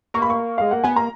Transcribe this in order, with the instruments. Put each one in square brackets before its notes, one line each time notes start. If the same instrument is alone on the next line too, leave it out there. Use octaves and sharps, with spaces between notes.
[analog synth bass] A#3 [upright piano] C#6
[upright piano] B5
C#6
[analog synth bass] G#3 [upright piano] F5
[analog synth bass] A#3 [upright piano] F#5
[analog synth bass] B3 [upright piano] G#5
[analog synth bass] A#3 [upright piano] A#5